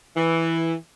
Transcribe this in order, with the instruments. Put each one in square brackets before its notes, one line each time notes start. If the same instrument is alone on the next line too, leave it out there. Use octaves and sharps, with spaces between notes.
[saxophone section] E3